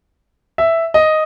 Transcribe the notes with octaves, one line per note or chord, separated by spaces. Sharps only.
E5
D#5